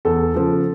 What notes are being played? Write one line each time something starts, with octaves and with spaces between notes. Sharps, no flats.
E2 A4
C#3 F3 A4